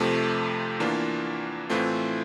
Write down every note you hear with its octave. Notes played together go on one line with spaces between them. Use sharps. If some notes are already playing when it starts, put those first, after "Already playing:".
Already playing: F2 C3 F3 A3
E2 E3 A#3 D4 F4
A2 E3 A3 C4 F4